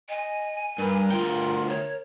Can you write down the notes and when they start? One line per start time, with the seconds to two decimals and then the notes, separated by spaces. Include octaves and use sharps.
0.09 D#5 G#5
0.78 G2 A#4
1.11 D2 F4 G5
1.68 C#5